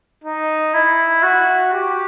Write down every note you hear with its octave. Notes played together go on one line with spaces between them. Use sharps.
D#4
E4
F#4
G4